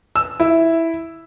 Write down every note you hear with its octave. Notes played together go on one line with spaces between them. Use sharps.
E6
E4